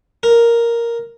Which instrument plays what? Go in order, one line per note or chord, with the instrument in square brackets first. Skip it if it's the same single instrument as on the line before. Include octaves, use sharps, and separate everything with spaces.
[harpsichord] A#4